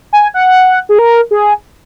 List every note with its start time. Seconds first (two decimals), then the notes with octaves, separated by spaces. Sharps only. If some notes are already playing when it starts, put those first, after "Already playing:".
0.13 G#5
0.34 F#5
0.89 G#4
0.99 A#4
1.31 G#4